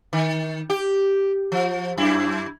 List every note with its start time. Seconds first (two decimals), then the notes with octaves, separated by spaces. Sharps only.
0.13 D#3
0.70 G4
1.52 F3
1.98 F#2 E4